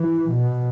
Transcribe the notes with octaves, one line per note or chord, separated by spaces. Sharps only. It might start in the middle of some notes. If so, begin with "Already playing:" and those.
Already playing: E3
B2